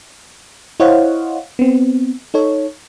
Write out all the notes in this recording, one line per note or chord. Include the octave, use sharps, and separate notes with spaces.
E4 C5 C#5 D#5 F5 F#5
B3 C4
D#4 A4 C#5